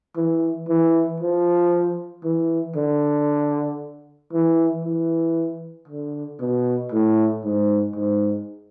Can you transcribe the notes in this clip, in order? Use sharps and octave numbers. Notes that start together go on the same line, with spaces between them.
E3
E3
F3
E3
D3
E3
E3
D3
B2
A2
G#2
G#2